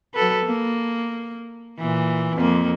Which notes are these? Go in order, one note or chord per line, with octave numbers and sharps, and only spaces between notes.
F#3 A4 B4
A#3
A#2 E3
F2 A#3